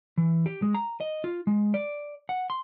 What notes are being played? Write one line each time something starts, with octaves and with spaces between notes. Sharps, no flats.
E3
G4
G#3
A#5
D#5
F4
G#3
D5
F#5
C6